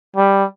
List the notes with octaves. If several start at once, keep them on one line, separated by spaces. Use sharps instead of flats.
G3